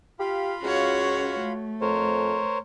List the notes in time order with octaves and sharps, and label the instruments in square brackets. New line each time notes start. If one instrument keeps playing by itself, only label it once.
[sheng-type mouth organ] F4 F5 B5 [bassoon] G4
[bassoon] C#2 [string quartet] C#4 F#4 C#5
[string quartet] A3
[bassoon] F2 [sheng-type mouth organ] A#4 C5 C#5